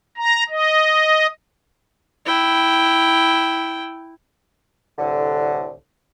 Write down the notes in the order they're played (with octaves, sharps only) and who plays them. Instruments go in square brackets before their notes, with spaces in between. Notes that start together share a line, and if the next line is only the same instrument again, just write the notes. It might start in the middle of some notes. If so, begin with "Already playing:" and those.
[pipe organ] A#5
D#5
[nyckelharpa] E4 G5
[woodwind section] C2 A2 D3